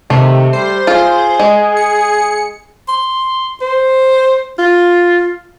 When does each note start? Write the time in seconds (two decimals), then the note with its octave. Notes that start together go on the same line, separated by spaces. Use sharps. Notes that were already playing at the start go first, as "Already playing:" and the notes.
0.10 C3 D#3 A3
0.53 G3 C5
0.87 F4 G#4
1.39 G#3
1.77 C#7
2.88 C6
3.61 C5
4.59 F4